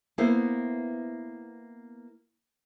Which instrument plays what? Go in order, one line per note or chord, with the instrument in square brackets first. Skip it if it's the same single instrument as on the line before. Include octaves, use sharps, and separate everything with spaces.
[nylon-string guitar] A#3 B3 E4 C5